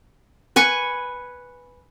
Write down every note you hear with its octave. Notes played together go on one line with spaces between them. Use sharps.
B4 G#5 C#6